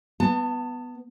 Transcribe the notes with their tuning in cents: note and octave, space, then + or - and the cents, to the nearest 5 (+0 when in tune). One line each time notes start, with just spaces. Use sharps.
B3 +0 A5 +30